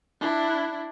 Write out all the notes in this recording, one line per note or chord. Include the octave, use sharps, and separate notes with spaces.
D4 E4